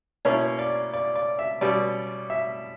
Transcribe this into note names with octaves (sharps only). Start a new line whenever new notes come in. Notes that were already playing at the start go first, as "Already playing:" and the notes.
B2 A#3 C#4 E4 C#5
D5
D5
D5
E5
B2 G3 C#4 D5
E5